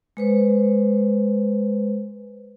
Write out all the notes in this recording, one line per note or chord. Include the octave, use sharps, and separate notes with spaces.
G#3 B4 C5